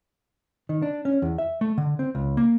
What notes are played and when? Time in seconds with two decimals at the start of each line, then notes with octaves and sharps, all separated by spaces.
0.69 D#3
0.82 D4
1.05 C#4
1.22 E2
1.38 E5
1.61 A3
1.78 D3
1.99 C4
2.15 C#2
2.37 A#3